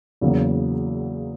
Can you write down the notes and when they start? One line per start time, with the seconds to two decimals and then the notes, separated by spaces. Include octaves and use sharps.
0.21 E2 C#3 F#3 A#3